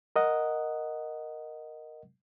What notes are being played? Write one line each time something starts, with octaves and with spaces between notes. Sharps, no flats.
A#4 D#5 F#5